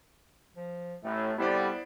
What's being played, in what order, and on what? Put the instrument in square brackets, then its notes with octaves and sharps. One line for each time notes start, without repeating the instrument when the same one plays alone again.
[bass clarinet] F3
[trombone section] A1 A2 [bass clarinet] A3
[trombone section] C2 D3 G3 [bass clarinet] B3 [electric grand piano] E4 C5 D5